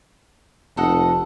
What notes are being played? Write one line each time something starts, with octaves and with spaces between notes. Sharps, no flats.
F1 A4 D#5 F#5